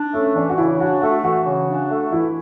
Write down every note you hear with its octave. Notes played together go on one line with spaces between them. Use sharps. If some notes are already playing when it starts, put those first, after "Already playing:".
Already playing: D4
A3 C#4
E3 D4
F#4
C#3 E4
D4 F#4
A3 F#4
E3 F#4
C#3
D4
A3
E3 E4